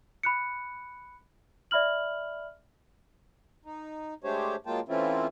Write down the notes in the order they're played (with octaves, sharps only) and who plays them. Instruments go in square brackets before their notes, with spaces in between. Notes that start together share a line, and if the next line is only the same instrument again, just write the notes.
[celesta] B5 F#6 C#7
D5 E5 B5 F6 F#7
[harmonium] D#4
G#3 A3 D4 G4 C5 C#5
F#3 G#3 A#3 F4 G5 A5
E3 A3 C4 C#4 E4 F4